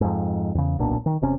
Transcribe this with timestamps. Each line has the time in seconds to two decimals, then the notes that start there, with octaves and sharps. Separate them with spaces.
0.01 F2 G#2
0.55 E2 C#3
0.78 D1 B1 A#2 D4
1.06 D#3
1.22 E1 C3 C#4